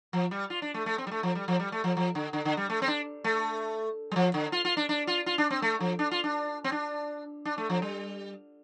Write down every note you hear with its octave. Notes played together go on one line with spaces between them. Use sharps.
F3
G3
F4
D4
A3
A3
C4
G3
A3
F3
G3
F3
G3
A3
F3
F3
D3
D3
D3
G3
A3
C4
D4
A3
G3
F3
D3
F4
F4
D4
D4
F4
F4
D4
C4
A3
F3
D4
F4
D4
C4
D4
D4
A3
F3
G3